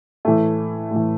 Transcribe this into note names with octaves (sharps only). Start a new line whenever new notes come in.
A2 E3 A3
A2 E3